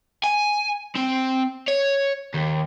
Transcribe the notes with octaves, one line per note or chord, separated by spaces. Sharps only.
G#5
C4
C#5
D#2